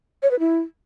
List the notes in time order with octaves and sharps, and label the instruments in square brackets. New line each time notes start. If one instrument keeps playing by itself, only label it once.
[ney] C#5
B4
E4